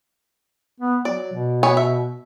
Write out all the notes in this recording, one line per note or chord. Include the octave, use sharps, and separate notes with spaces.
B3
F#3 D5
B2
B3 C#5 G#5
E5